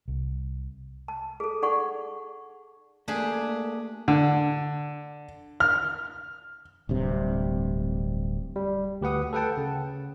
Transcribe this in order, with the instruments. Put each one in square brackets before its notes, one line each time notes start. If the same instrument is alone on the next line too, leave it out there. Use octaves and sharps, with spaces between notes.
[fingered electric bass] C2
[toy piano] A5
G#4 A4
D#4 G#4 D5 F#5 C#6
[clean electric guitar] A3 A#3 [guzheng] D4 G4 G#4
[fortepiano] D3
F6
[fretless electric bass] D1 G2 C3
[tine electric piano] G3
D2 G4 B4 F#5 D#6
A4 B4 F#5 G5 A5
C#3